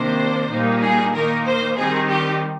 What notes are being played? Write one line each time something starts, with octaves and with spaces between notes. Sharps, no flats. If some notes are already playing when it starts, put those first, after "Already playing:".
Already playing: C3 D#3 A#3 D4 C5
A#2 G3 A#3 D#4
G#4
D#3 A#3 D#4 A#4
C5
D#3 G3 C4 D#4 G#4
G4